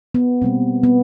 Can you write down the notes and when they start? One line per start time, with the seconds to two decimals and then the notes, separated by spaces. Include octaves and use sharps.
0.14 B3
0.42 B2 G3 A#3 C4
0.83 B3